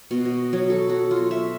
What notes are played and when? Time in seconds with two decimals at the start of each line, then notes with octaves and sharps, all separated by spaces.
0.11 B2
0.25 D#5
0.53 F#3
0.70 A4
0.90 F#4
1.11 F4
1.31 E5